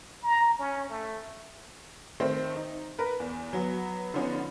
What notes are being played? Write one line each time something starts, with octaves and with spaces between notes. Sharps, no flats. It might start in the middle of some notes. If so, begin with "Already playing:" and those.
A#5
C#4
A3
D#3 A3 C4 C5
D#4
A#4 B4
E2
F#3 B3
D3 F3 B3 C#4 D#4